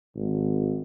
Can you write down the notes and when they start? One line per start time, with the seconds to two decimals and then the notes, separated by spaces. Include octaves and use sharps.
0.15 G#1